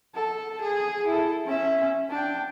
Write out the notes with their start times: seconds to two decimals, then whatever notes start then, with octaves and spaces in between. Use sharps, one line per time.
0.15 A4
0.61 G#4
1.07 E4 A4
1.45 C#4 E5
2.10 D4 G5